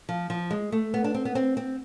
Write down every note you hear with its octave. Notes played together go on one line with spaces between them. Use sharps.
F3
F3
G#3
A3
B3
D4
C4
B3
C4
C4